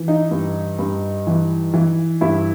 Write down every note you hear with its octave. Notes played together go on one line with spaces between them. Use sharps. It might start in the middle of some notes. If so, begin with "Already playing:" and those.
Already playing: E3
D#4
G2
G2
E3
E3
G2 E4